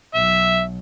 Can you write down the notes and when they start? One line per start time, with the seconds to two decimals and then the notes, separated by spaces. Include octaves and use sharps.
0.14 B1 F#3 E5